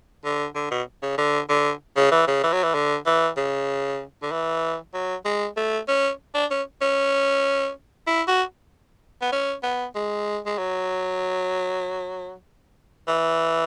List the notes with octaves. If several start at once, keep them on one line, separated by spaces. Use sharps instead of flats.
D3
D3
B2
C#3
D3
D3
C#3
E3
C#3
E3
F#3
E3
D3
E3
C#3
D3
E3
F#3
G#3
A3
C#4
D4
C#4
C#4
E4
F#4
B3
C#4
B3
G#3
G#3
F#3
E3